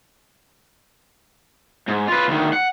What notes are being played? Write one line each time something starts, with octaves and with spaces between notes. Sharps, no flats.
G#2
F4 B4
D2 D#3
F#5